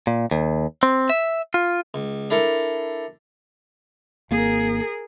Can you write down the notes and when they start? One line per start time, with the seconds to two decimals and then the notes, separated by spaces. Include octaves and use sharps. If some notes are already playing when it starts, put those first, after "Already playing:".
0.07 A#2
0.31 D#2
0.83 C4
1.10 E5
1.54 F4
1.94 C#2
2.30 D4 E4 A4 A#4
4.31 G#1 A#3 G#4 A#4